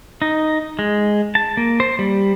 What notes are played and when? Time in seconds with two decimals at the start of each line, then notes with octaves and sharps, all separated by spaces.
0.22 D#4
0.79 G#3
1.35 A5
1.57 A#3
1.80 C5
1.99 G3